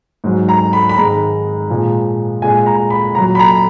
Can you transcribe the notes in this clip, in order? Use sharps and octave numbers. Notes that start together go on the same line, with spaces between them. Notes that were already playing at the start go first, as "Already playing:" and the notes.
G#2 F#3
A#5
B5
B5
G#2 D#3 G#3 A#5
A#2 F3 G#3
A#2 G#3 G#5
A#5
B5
A#2 F#3 A#5
B5
A#5